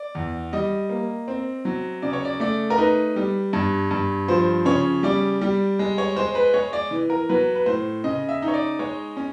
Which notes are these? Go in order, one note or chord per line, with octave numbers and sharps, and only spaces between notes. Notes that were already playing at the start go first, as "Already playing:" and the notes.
Already playing: D5
E2
G3 D#5
A#3
C4
F#3
C#3 D5
C#5
D5
A3 D5
A#4
D#4 B4
G3
G2
G2
F3 C5
C#3 C#5
G3 D5
G3
G#3
C#5
G#3 C5
B4
G#3 C#5
D5
E3
A#4
F#3 B4
B4
A2 C5
C#3 D#5
E5
D#4
C#5
D5
G#3 C#5
C#4